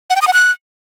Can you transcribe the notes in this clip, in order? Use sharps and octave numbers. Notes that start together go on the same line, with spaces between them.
F#5
G5
D#6
F#5
F#6